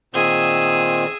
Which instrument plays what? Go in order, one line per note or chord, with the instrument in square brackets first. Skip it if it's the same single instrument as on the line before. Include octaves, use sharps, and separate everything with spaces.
[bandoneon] A#2 D#3 C4 [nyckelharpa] G#4 E5